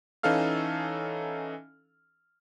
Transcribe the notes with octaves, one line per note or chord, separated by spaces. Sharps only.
E3 C#4 D#4 A4 F5 F6